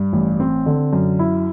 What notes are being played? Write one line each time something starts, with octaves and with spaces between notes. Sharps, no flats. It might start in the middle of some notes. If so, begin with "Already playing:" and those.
Already playing: G2
A1
C4
D3
F#2
E4